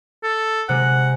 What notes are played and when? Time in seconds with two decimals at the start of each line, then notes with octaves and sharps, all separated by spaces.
0.23 A4
0.69 C3 G#3 F#5